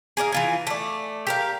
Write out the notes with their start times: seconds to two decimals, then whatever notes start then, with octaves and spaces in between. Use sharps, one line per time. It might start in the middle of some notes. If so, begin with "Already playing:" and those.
0.17 G#4 A#4 D5 F5
0.32 E3 F4 G#5
0.67 A3 D5
1.27 G4 A#4 F5